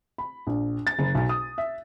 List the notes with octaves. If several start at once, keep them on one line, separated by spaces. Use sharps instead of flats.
B5
A#1
A6
F#1
B1
D#6
E5